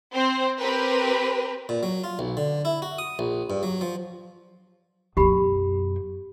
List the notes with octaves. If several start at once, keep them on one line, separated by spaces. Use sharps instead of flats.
C4 C5
C4 G4 A#4 B4
A#2
F#3
F4
B1
D3
E4
F#4
D#6
A#1
G2
F#3
F3
F#2 B2 G4 B5